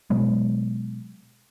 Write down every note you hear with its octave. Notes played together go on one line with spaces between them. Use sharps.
B2 F#3 G#3 B3